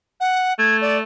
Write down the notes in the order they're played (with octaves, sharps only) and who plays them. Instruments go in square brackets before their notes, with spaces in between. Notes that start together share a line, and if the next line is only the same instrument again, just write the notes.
[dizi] F#5
[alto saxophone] A3 [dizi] G#6
[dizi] D5